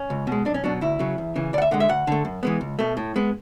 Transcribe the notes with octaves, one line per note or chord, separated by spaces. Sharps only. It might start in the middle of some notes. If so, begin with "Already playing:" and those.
Already playing: C#4
C#2
B2 G#3
B1 D4
C#4
B2 F#3 D4
D2 E4
C#3 F#3
E2
C#3 E3
D2 D5 F#5
E5
D3 G#3 F#5
E5
D2 F#5
D3 A3
F#2
E3 G#3 B3
C#2
B2 A3
A2
G#3 B3